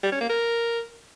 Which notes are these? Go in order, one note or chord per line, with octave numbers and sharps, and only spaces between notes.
G3
C#4
A#3
A#4